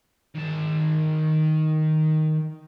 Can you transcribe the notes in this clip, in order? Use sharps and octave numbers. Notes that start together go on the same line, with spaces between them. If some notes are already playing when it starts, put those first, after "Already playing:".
D#3 A5